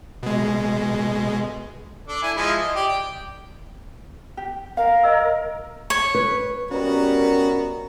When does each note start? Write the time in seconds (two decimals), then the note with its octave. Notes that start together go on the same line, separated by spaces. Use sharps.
0.23 B2 G#3
2.08 D4 A4
2.23 E4 G#5
2.37 F3 G#3 E4
2.60 D#5
2.75 G4 D5
2.88 G5
4.37 G4
4.77 A#4 F5
5.04 D#5 E6
5.90 C#5
6.15 B4
6.71 C3 G3 B3 C#4 F#4 A#4